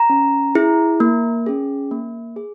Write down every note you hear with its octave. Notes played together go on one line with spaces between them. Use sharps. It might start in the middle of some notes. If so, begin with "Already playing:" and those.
Already playing: A#5
C#4
E4 G#4
A#3
C#4 G#4
A#3
G#4